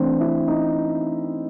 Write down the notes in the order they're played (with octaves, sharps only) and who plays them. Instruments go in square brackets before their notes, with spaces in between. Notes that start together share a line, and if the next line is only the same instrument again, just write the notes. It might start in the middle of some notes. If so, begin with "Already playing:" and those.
Already playing: [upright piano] E3 A3 C4 D4 C5
E4 E5
D#4 D#5